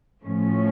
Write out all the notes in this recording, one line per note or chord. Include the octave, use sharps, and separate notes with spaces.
A2 F3 A3 C#4